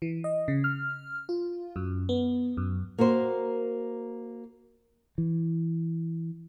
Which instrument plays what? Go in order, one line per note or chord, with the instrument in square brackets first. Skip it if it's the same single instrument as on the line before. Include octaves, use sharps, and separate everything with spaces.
[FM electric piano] E3
D#5
C#3
F6
F4
F#2
B3
F#2
[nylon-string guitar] A#3 F#4 A#4 C5
[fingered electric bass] E3